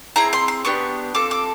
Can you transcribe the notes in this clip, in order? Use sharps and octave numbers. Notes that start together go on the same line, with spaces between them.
C4 E4 G#4 A#5
C6
C6
B3 D4 G4 C#6
C4 F4 A4 D6
D6